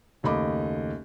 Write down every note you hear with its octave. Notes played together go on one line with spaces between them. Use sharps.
F#1 D#2 A3 D#5 B5 D6